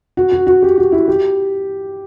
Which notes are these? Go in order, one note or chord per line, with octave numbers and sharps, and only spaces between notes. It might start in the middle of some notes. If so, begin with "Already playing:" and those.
F#4
F#4
F#4
G4
F#4
E4
G4